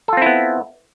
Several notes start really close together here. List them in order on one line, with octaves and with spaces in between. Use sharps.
A4 F4 C4 E4 B3